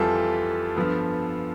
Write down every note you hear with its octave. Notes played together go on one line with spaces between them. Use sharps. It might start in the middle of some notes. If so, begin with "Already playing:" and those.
Already playing: F2 E3 G3 F4 A4
G2 F3 B3